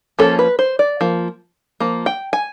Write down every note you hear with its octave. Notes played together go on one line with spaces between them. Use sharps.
F3 A#3 C#4 A4
B4
C5
D5
F3 A#3
F3 A#3
G5
G#5